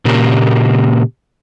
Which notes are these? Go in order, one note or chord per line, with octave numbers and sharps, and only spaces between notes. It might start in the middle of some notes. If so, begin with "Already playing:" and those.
A#2 C#3 A#3 G4